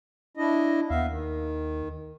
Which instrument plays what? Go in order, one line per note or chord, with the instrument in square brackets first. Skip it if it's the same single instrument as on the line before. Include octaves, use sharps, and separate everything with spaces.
[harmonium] D4 E4 D#5
[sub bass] D#2 [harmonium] B3 E5 F5
[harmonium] D#3